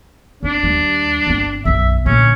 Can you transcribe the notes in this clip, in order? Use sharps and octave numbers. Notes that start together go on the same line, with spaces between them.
C4 D4 D#4
D#2 G3
G1 C4
B1 F#2 E5
A#2 D3 C#4